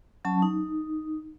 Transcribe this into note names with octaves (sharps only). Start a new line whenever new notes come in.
F#3 C#4 A5
D#4